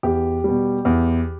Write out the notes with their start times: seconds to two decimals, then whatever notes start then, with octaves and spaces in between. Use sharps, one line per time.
0.03 E2 G4
0.44 B2 G3
0.85 E2